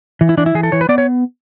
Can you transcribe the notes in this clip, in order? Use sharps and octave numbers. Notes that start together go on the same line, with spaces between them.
E3
E4
E3 D4
E4
E3 G#4
A4
E3 C#5
B4
B3 D5
C#5